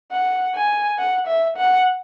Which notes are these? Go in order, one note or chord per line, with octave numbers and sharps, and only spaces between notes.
F#5
G#5
F#5
E5
F#5